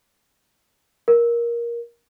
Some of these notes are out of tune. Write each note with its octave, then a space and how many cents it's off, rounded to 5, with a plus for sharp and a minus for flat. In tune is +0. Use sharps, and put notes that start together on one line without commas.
A#4 +15